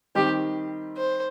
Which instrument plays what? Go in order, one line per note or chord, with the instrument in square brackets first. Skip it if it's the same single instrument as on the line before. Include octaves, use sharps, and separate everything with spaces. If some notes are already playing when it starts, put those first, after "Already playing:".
[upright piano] D#3 G3 C4 D#4 [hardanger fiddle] G4
[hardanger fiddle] C5